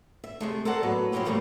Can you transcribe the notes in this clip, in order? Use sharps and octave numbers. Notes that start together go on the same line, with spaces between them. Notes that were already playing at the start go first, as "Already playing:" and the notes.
E5
C3 G#3 A3
A4 A#4 C5 D5 F#5 A5
A2 F#3 B3
F3 F#3 A3 C#4 E4 G4
A2 C#3 E3 G3 A3 A#3